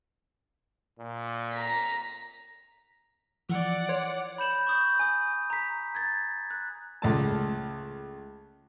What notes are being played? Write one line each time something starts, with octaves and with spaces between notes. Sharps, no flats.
A#2
A#5 B6
E3 F3 D5 F#5
C#5 C6
B5 G6 E7 F#7
C#6 D#6 G6
G#5 D#6
A#5 B6
G#6 A6
F#6
C#2 A3 A5